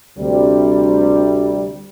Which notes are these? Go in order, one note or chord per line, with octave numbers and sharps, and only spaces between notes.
D2 C3 G3